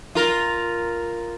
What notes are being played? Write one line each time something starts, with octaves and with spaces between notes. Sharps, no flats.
F4 A#4